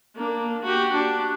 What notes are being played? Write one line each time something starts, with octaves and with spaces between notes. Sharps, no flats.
A#3 D4
F#4 G4
D4